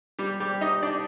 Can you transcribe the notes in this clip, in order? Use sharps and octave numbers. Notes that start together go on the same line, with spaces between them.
G3 G4
G3 G4
D#4 D#5
D4 D5